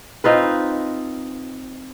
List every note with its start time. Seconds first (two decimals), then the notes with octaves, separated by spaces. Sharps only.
0.24 C4 D#4 F4 B4